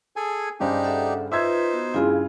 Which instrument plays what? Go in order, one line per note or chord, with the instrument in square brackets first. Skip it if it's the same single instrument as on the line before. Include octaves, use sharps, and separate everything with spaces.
[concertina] G#4 A4 G#5
[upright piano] G2 C#3 C5 [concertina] D4 D#4 G4
[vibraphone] A4 E5 F#5
[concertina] D#4 C5 [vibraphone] F4 B4 [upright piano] E5 E6 G#6
[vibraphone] B3 F#4
[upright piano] G2 C#3 F4 [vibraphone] E4 G#4